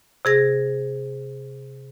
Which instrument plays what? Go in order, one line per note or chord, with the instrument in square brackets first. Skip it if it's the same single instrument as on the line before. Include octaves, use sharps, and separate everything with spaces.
[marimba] C3 G#4 A#6